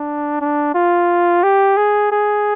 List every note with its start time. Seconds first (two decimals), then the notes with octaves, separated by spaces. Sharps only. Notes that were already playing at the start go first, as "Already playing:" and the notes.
Already playing: D4
0.41 D4
0.75 F4
1.43 G4
1.77 G#4
2.12 G#4